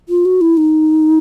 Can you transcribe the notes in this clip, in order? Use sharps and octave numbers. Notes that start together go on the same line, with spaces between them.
F4
F#4
E4
D#4